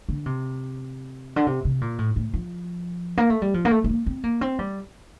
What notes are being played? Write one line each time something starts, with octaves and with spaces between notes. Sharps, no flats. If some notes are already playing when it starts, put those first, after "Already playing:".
D3
C3
D3
C3
C3
A#2
A2
A2
F3
A#3
A3
G3
F3
A#3
A3
A3
A#3
C4
A#3
C4
G3